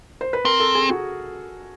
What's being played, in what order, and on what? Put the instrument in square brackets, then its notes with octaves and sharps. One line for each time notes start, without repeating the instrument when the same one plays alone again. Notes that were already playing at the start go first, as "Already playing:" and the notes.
[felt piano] C5
B4
[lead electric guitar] C4 [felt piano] A#4
[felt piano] A4
G#4
F#4